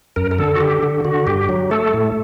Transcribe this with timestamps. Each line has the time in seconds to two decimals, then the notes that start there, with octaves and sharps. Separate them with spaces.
0.16 F#2 A#4
0.31 A#4
0.38 D3 A4
0.55 F#4
0.60 D3 G4
0.83 D3
1.05 D3 F#4
1.27 G2 G4
1.49 F#3
1.71 A3 A4
1.94 A2